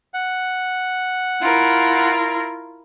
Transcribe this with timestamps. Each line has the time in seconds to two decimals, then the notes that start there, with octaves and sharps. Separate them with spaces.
0.14 F#5
1.41 E4 F4 A#4